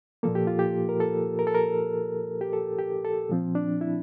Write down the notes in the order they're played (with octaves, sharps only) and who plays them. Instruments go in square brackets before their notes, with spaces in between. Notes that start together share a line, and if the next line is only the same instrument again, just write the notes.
[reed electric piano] A#2 F3 A#3 A4
G4
F4
G4
A#4
A4
A#4
A4
A#4
G4
A4
G4
A4
A#2 F3 C4
D4
E4